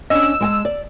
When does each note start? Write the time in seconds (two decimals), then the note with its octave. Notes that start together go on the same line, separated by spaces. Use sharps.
0.10 C#4 D4 D#5 E6
0.41 G#3 G5 A5
0.65 D5